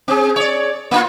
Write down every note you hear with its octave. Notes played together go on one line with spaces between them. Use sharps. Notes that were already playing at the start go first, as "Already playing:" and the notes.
C4 G#4
C#5 D5
A#3 D4 F4